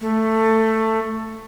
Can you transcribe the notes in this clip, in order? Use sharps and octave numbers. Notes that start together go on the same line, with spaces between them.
A3